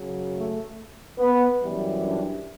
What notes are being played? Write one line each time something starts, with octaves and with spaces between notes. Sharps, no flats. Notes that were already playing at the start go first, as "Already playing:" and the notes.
Already playing: F#2 C#3 F#3
A3
B3
F#2 E3 G3
D4